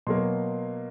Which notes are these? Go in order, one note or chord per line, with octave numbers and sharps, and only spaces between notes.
B2 F#3 A#3 C6